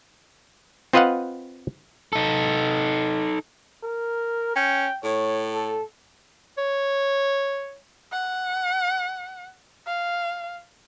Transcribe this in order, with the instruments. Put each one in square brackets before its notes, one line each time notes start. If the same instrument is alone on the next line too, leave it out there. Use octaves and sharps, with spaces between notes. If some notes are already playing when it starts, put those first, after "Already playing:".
[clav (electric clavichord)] C4 F4 B4 D#5 F5 F#5
[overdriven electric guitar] D#4 A4
[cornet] A#4
[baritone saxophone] C#4 [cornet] G5
[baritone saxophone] A2 [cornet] C#5
[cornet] A4
[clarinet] C#5
[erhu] F#5
F5